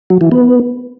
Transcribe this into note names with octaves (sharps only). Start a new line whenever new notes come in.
F#3
E3
B3